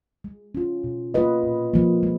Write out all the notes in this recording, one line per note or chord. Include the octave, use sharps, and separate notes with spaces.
G#3
C#4 F4
B2
A#3 F4 B4 D#5
A#2
F3 A#3
G#3